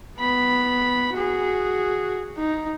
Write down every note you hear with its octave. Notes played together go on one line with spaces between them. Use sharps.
B3 B5
F#4 G#4
D#4